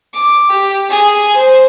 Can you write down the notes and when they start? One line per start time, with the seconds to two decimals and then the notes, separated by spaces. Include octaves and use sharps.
0.13 D6
0.49 G4
0.89 G#4
1.35 C5